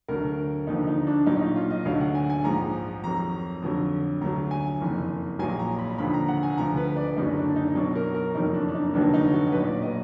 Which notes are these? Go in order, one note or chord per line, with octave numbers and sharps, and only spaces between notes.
D2 D3 F#3 A#4
D#2 D3 F3 D#4
D#4
D4
B1 A#2 F#3 D#4
D#4
F4
D#5
D2 D3 F#3 F5
F#5
G#5
G#5
A#1 G#2 F3 A#5
F2 D#3 F#3 A#5
F2 D3 F#3
D2 D3 F#3 A#5
G#5
F#1 F2 D#3
A#1 A#2 F#3 G#5
A#5
B5
D#2 D3 F3 B5
A#5
F#5
G#5
D2 D3 F3 A#5
B4
D5
F#1 F#2 D3 F#3 D#4
D4
D#4
B1 B2 F#3 D5
A#4
A#4
F#1 F2 D#3 F#3 D#4
D4
D4
D#4
F1 D#2 D3 F#3 D4
D#4
F#4
B1 A#2 F#3 B4
D5
D#5